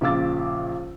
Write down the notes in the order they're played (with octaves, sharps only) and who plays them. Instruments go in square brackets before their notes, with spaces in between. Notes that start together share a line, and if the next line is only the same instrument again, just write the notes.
[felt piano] A#1 C#3 F4 D6 E6 A6